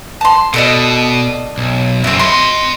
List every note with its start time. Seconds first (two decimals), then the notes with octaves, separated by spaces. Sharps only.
0.21 A5 C6
0.54 B2 A4 D5 D#5
1.58 B1
2.04 F#2 C#3 C4 E5
2.19 D#5 B5 C6